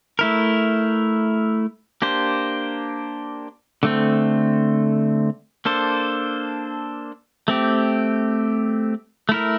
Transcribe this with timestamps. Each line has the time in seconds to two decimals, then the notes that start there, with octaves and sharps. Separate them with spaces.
0.19 A3 E4 A#4
2.02 A#3 D4 G4 C5
3.83 D3 A3 C4
5.65 A#3 D4 A4 C5
7.48 A3 C4 G4
9.29 A3 E4 A#4